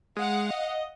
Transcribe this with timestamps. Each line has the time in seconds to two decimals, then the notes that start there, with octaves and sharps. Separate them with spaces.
0.17 G#3 F5 F#5
0.50 D#5